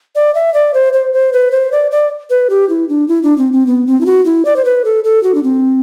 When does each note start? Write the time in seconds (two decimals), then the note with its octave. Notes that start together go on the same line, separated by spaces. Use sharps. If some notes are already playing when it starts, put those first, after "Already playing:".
0.15 D5
0.35 E5
0.54 D5
0.74 C5
0.93 C5
1.13 C5
1.33 B4
1.52 C5
1.72 D5
1.91 D5
2.30 B4
2.50 G4
2.69 E4
2.89 D4
3.08 E4
3.23 D4
3.38 C4
3.53 C4
3.67 B3
3.87 C4
4.01 E4
4.06 F#4
4.25 E4
4.45 D5
4.56 C5
4.65 B4
4.85 A4
5.04 A4
5.23 F#4
5.35 D4
5.43 C4